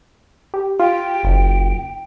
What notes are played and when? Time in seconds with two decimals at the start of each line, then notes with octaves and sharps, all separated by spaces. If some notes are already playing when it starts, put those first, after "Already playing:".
0.54 G4
0.80 F4 G5
1.23 F#1